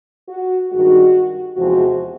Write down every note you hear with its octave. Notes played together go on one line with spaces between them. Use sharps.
F#4
G2 D#3 G#3 F#4
E2 C3 F3 G#3 F#4